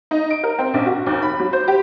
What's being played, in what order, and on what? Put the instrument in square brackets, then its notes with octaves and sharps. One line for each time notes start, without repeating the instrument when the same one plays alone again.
[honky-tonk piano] D#4
D7
A#4
C4
A#1
F#4
D#2
B5
F#3
C5
G4